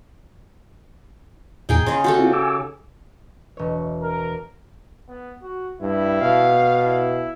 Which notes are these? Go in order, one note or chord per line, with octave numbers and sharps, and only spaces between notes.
E2 A#2 D#4 G#4 G5
C#3 D#5 C6
F#4 G4 A4
C4 E4 F4
G#5 D6 E6
E1 C#5
A#4
B3
F#4
G2 E4
B2 F5
E4